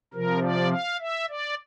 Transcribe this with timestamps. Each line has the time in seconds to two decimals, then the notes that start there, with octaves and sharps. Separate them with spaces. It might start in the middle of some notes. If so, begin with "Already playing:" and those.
0.14 C3 F3 A#4
0.43 D5
0.71 F5
1.00 E5
1.29 D5